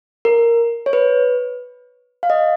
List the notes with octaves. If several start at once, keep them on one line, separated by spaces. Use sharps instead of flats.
A#4
C#5
B4
F5
D#5